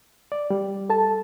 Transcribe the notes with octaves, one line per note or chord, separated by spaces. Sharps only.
D5
G3
A4 A5